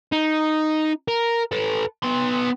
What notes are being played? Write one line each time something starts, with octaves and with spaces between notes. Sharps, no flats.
D#4
A#4
A4 B4
B3 C6